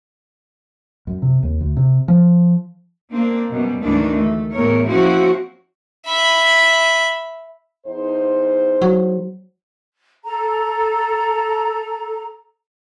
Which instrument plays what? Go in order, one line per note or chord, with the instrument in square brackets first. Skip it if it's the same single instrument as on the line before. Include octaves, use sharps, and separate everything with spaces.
[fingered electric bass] F#2
C3
D#2
D2
C3
F3
[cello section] A#3 C4 D4
F#2 B2 G3
D2 G#2 D#3 E3 D4
A3
E2 A2 A3 B3 A#4 C#5
F3 A#3 C4 C#4 E4 F#4
[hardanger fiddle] E5 B5
[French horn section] E2 D#4 C5
[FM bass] F#3
[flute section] A4 A#5